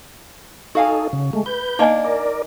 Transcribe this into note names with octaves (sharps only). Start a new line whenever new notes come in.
D#4 F#4 A4 F5 G#5
C#3
G#3 A3
B4 G6
A#3 D4 D#4 D#5 G#5
A#4 D5